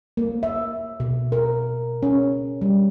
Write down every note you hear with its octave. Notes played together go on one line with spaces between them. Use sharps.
A#3
E5
B2
A#4
C#4
G3